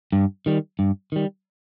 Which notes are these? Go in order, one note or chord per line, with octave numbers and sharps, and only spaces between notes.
G2
D#3 G3
G2
D#3 G3